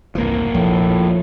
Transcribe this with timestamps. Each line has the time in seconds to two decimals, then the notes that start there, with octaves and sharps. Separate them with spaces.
0.15 F1 C2 G#2 E3 A#3
0.55 A#1 A2 F3